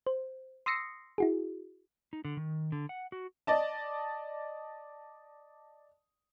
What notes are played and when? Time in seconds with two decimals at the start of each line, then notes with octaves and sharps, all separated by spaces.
0.07 C5
0.66 C6 D#6 E6 A#6 C7 C#7
1.18 E4 F#4 G#4
2.13 D#4
2.25 D3
2.37 D#3
2.72 D3
2.89 F#5
3.12 F#4
3.47 D5 D#5 A5